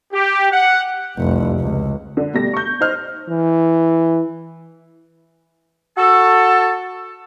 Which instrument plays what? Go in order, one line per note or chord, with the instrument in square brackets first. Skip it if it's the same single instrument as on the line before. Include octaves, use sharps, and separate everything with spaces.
[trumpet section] G4
F#5
[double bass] F1 C2
C#2
[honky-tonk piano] D3
B2 G3 A3 A#6
C#6 G6
D#4 C5 D#5 F6
[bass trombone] E3
[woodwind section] F#4 A4